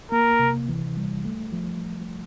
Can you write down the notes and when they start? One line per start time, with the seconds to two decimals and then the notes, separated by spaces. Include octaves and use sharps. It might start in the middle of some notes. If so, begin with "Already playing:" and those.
0.12 A#3 A#4
0.39 C3
0.69 E3
0.97 G3
1.25 A3
1.52 F3